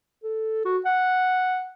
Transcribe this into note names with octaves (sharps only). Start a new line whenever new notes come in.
A4
F#4
F#5